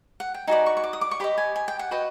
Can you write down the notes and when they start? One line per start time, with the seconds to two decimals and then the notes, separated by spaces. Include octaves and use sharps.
0.20 F#5
0.34 G5
0.47 D#4 F#4 B4 D5 G#5
0.66 C#6
0.77 C#6
0.84 D6
0.93 D#6
1.01 D6
1.11 C#6
1.20 G4 B4 D#5 B5
1.38 G#5
1.56 G#5
1.68 G5
1.79 F#5
1.91 F#4 B4 D#5 G5